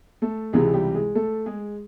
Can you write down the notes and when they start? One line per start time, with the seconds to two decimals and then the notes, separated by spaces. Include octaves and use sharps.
0.22 A3 A4
0.53 C#2 C3 E3 G#3 G#4
0.74 G3 G4
0.95 G#3 G#4
1.15 A3 A4
1.46 G#3 G#4